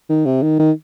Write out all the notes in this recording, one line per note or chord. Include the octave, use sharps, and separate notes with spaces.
D#3
C3
D#3
D#3